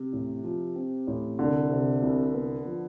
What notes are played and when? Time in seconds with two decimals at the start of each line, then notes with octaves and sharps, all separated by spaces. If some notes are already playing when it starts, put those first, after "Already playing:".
Already playing: C3
0.13 A1
0.44 F3
0.76 C4
1.07 A1
1.39 C2 D3
1.70 C3
2.02 C2
2.34 B3
2.65 F3